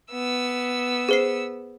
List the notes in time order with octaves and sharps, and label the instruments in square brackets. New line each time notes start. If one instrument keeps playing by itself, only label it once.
[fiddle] B3 E6
[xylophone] G#4 C5 C7